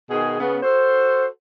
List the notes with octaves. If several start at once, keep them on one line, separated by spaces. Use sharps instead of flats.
B2 D#3 G#4
C#3 B3
F#4 A4 C5